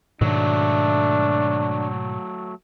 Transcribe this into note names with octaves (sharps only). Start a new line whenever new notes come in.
G#2 B2 D#3 F#3 A3 D4